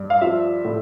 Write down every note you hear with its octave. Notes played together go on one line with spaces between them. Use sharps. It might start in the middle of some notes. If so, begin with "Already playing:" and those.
Already playing: G2
F5
F3 E5
A2